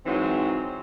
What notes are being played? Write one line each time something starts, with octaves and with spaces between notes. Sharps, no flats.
G#2 E3 F#3 C4